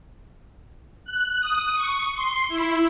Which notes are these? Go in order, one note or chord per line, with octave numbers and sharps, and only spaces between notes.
F#6
D#6
C#6
C6
E4